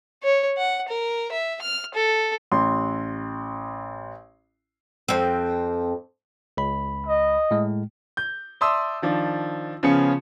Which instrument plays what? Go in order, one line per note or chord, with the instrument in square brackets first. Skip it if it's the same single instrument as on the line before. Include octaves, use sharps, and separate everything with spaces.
[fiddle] C#5
F#5
A#4
E5
F6
A4
[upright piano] A1 C6
[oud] F2 C4
[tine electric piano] C#2 B5
[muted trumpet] D#5
[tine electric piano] A2 G#3
[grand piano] G6
D5 E5 A5 C6 D#6 E6
D#3 F3 D4
C#3 F3 B3 C#4 C#7